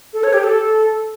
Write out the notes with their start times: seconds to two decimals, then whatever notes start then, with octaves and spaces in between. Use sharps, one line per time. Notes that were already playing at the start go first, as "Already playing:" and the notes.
0.13 A4
0.24 C#5
0.33 G4
0.43 A4